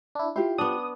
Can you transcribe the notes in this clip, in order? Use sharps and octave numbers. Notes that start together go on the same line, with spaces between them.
D4 E4
E4 F4 G4 C5
B3 D4 D#6